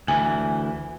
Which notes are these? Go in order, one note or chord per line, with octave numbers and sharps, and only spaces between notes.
D2 E3 G#5